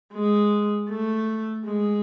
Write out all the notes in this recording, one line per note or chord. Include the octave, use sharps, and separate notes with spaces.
G#3
A3
G#3